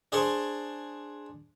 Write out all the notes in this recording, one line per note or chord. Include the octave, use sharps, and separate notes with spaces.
D4 G#4 C5 A5 C6 C#6